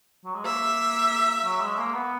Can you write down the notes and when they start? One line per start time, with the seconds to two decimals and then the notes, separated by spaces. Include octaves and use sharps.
0.24 F#3
0.34 G#3
0.45 A#3 E5
1.44 F#3
1.61 G#3
1.78 A#3
1.94 B3